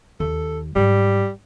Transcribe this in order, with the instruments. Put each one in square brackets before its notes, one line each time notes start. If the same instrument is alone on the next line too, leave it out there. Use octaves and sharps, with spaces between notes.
[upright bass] D#2 [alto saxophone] A4
[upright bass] G#2 F#3 [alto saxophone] G3